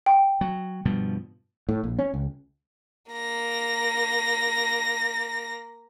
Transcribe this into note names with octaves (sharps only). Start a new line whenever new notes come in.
G5
F#3
G2 B2 F3
A2
A#1
C#4
C#2
A#3 A#6